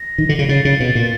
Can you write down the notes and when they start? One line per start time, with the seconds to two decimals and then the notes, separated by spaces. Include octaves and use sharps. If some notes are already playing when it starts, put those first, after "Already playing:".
Already playing: A#6
0.18 D#3
0.29 D3
0.39 C#3
0.49 C#3 A6
0.65 C#3
0.80 B2
0.95 A#2